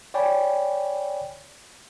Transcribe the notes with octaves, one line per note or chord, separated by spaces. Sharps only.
C#5 D5 G5 G#5 B5